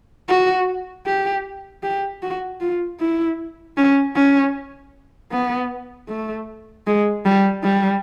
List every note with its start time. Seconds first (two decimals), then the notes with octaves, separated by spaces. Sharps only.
0.29 F#4
1.07 G4
1.83 G4
2.22 F#4
2.61 F4
3.00 E4
3.77 C#4
4.16 C#4
5.32 B3
6.09 A3
6.87 G#3
7.25 G3
7.64 G3